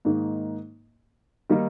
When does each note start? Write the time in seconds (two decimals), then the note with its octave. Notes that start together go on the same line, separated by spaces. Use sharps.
0.05 G#2 D#3 A#3
1.50 D#3 G3 A#3 D#4